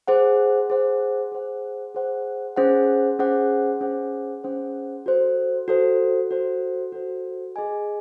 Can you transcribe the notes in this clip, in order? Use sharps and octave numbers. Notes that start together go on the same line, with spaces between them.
G#4 C5 F#5
G#4 C5 F#5
G#4 C5 F#5
G#4 C5 F#5
C#4 G#4 C5 F#5
C#4 G#4 C5 F#5
C#4 G#4 C5 F#5
C#4 G#4 C5 F#5
F#4 A4 C5
F#4 A4 C5
F#4 A4 C5
F#4 A4 C5
G#4 D#5 G#5